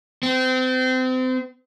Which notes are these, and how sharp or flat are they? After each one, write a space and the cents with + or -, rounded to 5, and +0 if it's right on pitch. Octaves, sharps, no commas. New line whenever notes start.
C4 -30